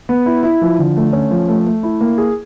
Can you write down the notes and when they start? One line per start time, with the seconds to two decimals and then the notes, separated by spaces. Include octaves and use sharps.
0.09 B3
0.26 E4
0.43 E4
0.61 F3
0.79 D3
0.96 A3
1.13 C#4
1.31 F3
1.48 A3
1.66 A3
1.83 E4
2.01 A#3
2.18 G#4